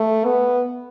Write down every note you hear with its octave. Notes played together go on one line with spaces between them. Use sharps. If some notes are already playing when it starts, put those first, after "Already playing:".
Already playing: A3
B3